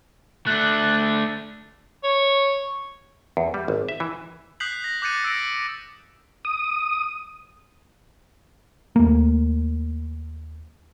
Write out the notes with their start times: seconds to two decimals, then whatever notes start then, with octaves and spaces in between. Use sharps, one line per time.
0.47 A3 D4 F#6
2.04 C#5
3.37 E2
3.54 G3
3.68 G#1
3.89 E5
4.00 E3
4.60 D#6 F#6 G6 B6 C7 F#7
4.84 A#6
5.02 D6 F#6 G6 A6 C#7 D#7
5.24 E6 A#6 C#7 D7
6.45 D#6
8.96 D#2 A3 A#3